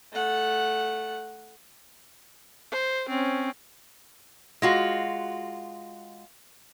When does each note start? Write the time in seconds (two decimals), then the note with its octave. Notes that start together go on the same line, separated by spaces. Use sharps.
0.13 A3 F#5
2.72 C5
3.09 C4 C#4
4.62 G#3 F4 F#4